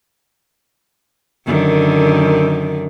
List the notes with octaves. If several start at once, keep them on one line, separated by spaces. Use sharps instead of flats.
F#2 D3 D#3